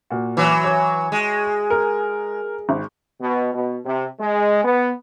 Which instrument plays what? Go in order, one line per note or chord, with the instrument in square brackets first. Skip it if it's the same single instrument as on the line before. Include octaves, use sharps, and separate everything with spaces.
[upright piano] A#2 F#4
[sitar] E3 F#3
[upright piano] C#5 C#6
[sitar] G#3
[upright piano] A#4
G#1
[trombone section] B2
B2
C3
G#3
B3